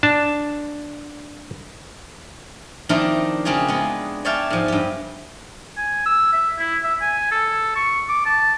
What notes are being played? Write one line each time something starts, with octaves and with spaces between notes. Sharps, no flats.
D4 A5
D#3 F3 A#3 C4 D4 E4
C#3 C4 D4 F4 G#4
G#3 B3
C#5 D5 E5 F5 G5 A5
G#2 F3
G2 G4
G#5
E6
E5
E4
E5
G#5
A4
C#6
D6
A5